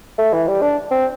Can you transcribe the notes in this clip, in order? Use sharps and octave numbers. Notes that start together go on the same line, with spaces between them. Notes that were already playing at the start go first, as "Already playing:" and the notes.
A3
E3
G3
D4
C4